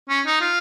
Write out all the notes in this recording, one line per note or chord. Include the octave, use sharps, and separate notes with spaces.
C#4
D#4
F4